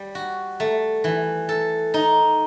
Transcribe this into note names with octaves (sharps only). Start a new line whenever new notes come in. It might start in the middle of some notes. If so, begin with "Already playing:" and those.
Already playing: G3
F#4
A3
E3
A4
D#4